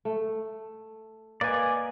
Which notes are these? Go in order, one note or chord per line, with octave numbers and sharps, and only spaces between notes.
A3
A#3 B4 D5 D#5 G#5